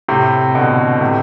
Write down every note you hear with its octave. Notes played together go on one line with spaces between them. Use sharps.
A2 C3
B2 D3
A2 C3